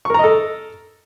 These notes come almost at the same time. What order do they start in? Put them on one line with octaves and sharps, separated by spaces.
C#6 A#4 A#5 D#5 A4